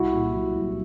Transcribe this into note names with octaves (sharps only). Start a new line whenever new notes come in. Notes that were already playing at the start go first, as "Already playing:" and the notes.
Already playing: C2 E4 F#4
A#2
F#3
C2